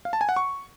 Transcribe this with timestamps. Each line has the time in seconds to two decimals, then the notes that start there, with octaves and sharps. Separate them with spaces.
0.05 F5
0.13 A5
0.21 G#5
0.29 F#5
0.36 C#6